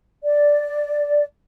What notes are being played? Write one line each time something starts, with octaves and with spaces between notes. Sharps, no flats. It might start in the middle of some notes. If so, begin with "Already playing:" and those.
D5